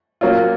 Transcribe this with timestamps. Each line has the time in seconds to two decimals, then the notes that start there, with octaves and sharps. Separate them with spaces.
0.21 F#3 A#3 C#4 F4